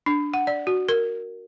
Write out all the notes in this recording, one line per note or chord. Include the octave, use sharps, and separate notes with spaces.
D4
F#5
D5
F#4
A#4